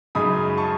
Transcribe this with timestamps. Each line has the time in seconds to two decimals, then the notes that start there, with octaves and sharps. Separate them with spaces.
0.15 F#2 C#3 G#3 D#4 B5 D#6
0.57 A5 C#6